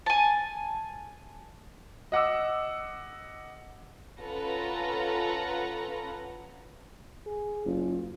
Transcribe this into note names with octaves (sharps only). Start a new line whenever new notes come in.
G#5 A5
D#5 F#5 D6 E6
C#4 F4 A4 B4 F#5 A#5
G#4
F#1 F4